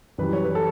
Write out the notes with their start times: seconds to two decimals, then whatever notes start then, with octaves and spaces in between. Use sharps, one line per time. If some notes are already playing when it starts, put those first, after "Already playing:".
0.18 F#2 E3 G3 B4
0.33 C#5
0.44 B4
0.55 A4